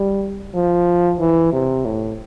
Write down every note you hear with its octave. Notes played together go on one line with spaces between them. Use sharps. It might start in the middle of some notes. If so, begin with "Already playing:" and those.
Already playing: G3
F3
E3
C3
A2